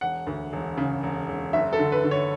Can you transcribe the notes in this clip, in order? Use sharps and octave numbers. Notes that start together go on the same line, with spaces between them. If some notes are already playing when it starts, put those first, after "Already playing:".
E1 F#5
D2
E1
C#3
E1
E1
F#1 E5
A4
D3
B4
D3
C#5